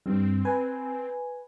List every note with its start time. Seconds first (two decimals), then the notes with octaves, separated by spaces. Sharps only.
0.06 G2 C4
0.45 B4 G#5